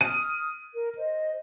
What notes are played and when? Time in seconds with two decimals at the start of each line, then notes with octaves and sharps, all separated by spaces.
0.01 D#6 F6 D#7
0.73 A#4
0.97 C5 D#5